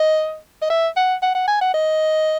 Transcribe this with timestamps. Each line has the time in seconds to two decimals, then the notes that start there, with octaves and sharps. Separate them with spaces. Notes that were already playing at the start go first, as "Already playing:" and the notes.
Already playing: D#5
0.62 D#5
0.70 E5
0.96 F#5
1.23 F#5
1.35 F#5
1.48 G#5
1.62 F#5
1.74 D#5